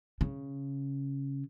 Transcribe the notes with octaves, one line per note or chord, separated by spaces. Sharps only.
C#3